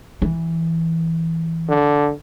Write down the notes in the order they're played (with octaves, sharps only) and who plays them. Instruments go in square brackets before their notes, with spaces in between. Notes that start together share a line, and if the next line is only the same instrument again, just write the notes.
[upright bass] E3
[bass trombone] D3